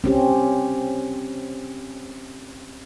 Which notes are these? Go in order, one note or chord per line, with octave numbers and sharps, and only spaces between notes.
C4 C#4 G4